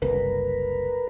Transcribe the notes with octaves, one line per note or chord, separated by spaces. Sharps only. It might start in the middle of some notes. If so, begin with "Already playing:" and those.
F#1 C2 A#4 B4